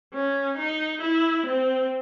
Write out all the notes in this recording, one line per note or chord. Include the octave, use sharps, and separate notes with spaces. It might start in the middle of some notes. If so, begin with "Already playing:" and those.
C#4
D#4
E4
C4